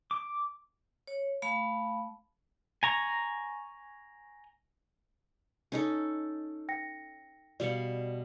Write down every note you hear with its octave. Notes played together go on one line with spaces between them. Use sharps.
D6
C#5
A3 F5 A5 B5
G#5 A#5 C#6
C#4 D#4 A4
G5 A#6 C#7
B2 G3 D5 F5 C#7